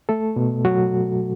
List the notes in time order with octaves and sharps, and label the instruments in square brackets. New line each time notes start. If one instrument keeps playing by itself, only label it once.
[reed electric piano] A3 A4
B2
F#3 F#4